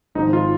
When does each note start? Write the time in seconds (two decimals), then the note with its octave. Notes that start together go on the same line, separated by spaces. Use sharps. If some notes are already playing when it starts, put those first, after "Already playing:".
0.15 G#1 G#2 F3 D#4
0.33 F4